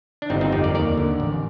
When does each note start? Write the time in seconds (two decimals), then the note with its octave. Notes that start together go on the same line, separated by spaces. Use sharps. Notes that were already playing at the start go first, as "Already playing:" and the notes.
0.22 D4
0.30 G1 C4 D#4
0.41 C4 D#4
0.52 F2 D#4 G4
0.64 A#4 D5
0.75 D#2 A#4 D5
0.97 D3
1.20 A1